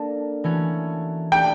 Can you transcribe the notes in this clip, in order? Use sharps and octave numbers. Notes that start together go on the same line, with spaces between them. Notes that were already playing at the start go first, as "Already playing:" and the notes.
Already playing: A#3 D4 A4
E3 A3 C#4 F#4
A3 D4 G4 G5